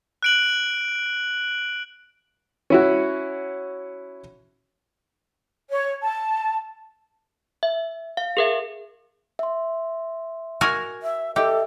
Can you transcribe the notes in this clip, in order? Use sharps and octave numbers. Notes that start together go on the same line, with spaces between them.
F#6 D7 F#7
C#4 E4 F#4
C#5
A5
E5
F5
G#4 A#4 E5
E5 C6
F#4 A#4 G#5
E5
G4 A4 D#5 E5